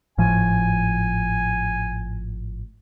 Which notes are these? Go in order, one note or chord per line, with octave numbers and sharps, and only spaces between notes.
G#1 A2 F3 G#5